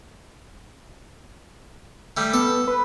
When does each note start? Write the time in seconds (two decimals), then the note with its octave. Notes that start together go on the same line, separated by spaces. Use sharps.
2.17 G3 A3
2.34 B3 A4
2.67 B4